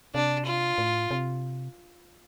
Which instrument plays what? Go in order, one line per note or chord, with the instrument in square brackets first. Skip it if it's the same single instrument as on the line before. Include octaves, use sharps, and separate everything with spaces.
[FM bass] C3 [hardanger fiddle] D4
[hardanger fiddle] F4
[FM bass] A2
C3